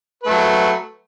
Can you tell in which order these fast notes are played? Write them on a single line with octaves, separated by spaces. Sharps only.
B4 A3 F#3